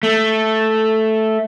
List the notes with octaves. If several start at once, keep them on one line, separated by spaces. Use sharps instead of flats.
A3